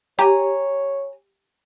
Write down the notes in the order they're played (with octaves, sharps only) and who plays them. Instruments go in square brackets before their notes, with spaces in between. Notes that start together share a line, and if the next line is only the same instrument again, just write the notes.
[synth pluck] G4 [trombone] C#5 [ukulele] G#5 A#5